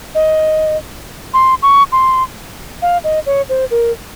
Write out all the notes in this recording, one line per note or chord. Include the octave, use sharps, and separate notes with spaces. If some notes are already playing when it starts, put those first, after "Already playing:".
D#5
C6
C#6
C6
F5
D#5
C#5
C5
A#4